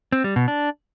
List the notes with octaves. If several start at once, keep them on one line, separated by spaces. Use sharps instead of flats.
C4
G3
B2
D4